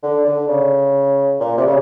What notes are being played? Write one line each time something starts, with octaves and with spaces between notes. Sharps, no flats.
D3
D3
C#3
A#2
C3
C#3